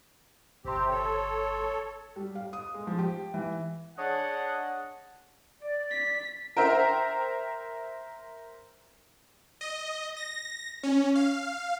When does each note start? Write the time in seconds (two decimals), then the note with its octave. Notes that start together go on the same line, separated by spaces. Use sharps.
0.65 G1 C3 C4 G4 C6
0.90 A4 C#5
2.16 G3
2.35 F5
2.53 D#6
2.74 G#3
2.87 F3
2.99 G4
3.34 E3
3.98 D4 G#4 C#5 D#5 F#5
5.62 D5
5.91 B6
6.56 A#4 C5 E5 G5 A#5
9.61 D#5
10.17 A#6
10.83 C#4
11.15 F5